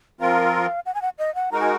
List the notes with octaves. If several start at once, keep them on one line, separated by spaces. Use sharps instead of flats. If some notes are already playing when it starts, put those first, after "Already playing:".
F3 C4 F4 A#4 F5
F#5
G#5
F#5
D#5
F#5
G#3 D#4 F#4 A#4 A#5
G#5